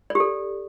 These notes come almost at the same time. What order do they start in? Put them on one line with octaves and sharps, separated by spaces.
D5 G4 A4